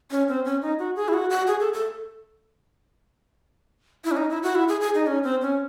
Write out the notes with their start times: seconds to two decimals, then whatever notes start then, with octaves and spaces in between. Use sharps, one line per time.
0.11 C#4
0.28 C4
0.45 C#4
0.62 D#4
0.79 F#4
0.96 G#4
1.08 E4
1.13 F#4
1.30 F#4
1.47 G#4
1.60 A4
1.73 A4
4.05 E4
4.11 C#4
4.17 D#4
4.30 E4
4.43 F#4
4.55 E4
4.68 G#4
4.81 G#4
4.94 D#4
5.07 C#4
5.24 C4
5.42 C#4